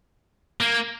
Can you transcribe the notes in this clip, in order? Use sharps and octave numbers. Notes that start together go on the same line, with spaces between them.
A#3